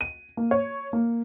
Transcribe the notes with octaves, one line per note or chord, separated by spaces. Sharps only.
D#7
A#3
C#5
A#3